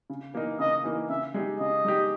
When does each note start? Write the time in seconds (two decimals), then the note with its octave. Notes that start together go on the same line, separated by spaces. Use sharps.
0.10 C#3
0.34 E3 A#3 D#4
0.59 C#3 D#5
0.84 E3 A#3 D#4
1.09 C#3 E5
1.34 G#3 D#4 G4
1.59 C#3 D#5
1.84 G#3 D#4 G4